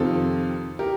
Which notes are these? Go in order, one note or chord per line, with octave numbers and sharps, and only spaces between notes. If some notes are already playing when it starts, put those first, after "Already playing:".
Already playing: F2 C3 D#3 F4 A4
G4 A#4